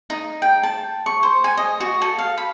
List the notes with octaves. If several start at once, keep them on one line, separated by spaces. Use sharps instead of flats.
D#4
G5
A5
C#6
C5
G#5
D#5
F#4
A4
F5
B5